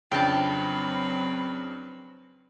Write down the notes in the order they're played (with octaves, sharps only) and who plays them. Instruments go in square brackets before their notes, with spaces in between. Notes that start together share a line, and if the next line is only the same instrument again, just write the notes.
[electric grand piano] F2 C#3 D4 [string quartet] F#3 C4 B4 [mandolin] G5 A5